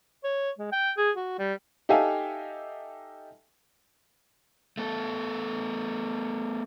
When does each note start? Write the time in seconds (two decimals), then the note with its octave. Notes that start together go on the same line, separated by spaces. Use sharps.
0.24 C#5
0.59 G#3
0.72 G5
0.97 G#4
1.17 F#4
1.39 G3
1.89 D#4 G4 A4 E5 F5 G#5
4.77 A3 B3 A4